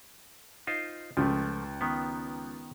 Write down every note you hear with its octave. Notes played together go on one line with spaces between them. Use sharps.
D#4 F4 C5
C#2 F3 A3
D#3 B3